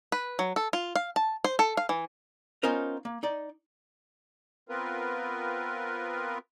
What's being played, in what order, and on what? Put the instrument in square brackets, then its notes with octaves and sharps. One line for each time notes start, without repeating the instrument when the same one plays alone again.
[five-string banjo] B4
F#3
A4
F4
F5
A5
C5
A4
F5
E3
[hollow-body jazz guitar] B3 C#4 D#4 F4 A#4 C5
A#3
D#4 D5
[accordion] B3 C4 F4 A#4 B4